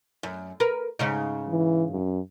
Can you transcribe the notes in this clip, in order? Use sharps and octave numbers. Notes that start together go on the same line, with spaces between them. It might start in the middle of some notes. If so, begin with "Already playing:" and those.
F#2
A#4 B4
G#2 C#3 D#4
E3
F#2